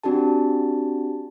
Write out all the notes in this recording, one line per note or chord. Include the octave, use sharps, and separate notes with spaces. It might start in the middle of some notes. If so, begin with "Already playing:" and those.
C4 D4 F#4 G4 A5